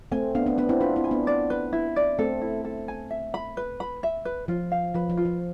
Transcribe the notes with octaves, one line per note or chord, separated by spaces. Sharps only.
A3 C4 G#5
B3 D4 F5
B3 D4
B3 D4 B4
C4 E4
D4 F4 B4
C4 E4
G#5
B3 D4
D5
B4
E4
D5
A3 C4 A4
E4
A4
G#5
E5
B5
B4
B5
E5
B4
F3 F4
F5
F3 B4
F3
F4
F3